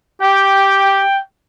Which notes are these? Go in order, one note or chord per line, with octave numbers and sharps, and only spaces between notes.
G4 G5